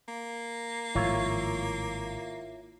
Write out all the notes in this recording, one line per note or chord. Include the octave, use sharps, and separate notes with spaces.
A#3
G#1 A2 F3 E4 F4 C#5